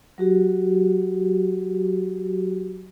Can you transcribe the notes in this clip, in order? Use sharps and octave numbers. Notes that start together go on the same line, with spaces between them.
F#3 F#4 G4